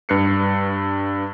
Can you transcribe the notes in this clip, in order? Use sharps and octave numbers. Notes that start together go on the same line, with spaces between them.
G2 B4 F#6 C7 C#7